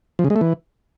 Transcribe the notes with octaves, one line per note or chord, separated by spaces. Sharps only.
F3
C#3
G#3
A3
E3